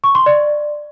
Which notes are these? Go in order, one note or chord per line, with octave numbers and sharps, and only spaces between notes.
C#6
C6
D5